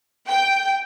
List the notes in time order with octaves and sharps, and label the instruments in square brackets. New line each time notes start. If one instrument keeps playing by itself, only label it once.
[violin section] G5